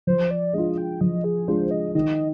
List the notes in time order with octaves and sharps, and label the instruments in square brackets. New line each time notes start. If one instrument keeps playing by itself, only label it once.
[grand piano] F3 [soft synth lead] C5
[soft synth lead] D5
[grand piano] G#3 D4 F4 [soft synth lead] D#5
[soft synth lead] G5
[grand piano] F3 [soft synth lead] D#5
[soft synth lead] G#4
[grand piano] G#3 D4 F4 [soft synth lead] C5
[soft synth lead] D#5
[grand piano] D#3 [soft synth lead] D#5